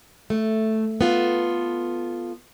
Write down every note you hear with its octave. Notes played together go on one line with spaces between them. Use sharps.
A3
B3 F4 A4